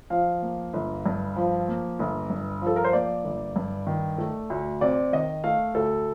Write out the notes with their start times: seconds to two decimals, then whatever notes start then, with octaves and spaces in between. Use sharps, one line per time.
0.10 F3 F5
0.42 A#3
0.74 G1
1.06 G2
1.36 F3
1.68 A#3
1.99 G1
2.30 G2
2.62 F3
2.67 A4
2.76 A#4
2.84 C5
2.93 A#3 D5
3.24 G1
3.56 G2
3.87 D#3
4.18 A3
4.50 D2
4.81 C3 D5
5.13 D#3 D#5
5.44 A3 F5
5.75 D2 A4